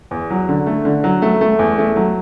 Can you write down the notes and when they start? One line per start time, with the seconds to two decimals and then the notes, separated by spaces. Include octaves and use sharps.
0.11 E2
0.30 F#3
0.49 D3
0.66 A3
0.85 D3
1.04 F#3
1.22 A3
1.41 A3
1.59 E2
1.78 A3
1.96 F#3